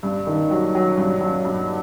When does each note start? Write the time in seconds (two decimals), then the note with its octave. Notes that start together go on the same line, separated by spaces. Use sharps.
0.03 G2
0.27 D#3
0.51 F#3
0.75 F#3
0.97 G2
1.21 F#3
1.45 G2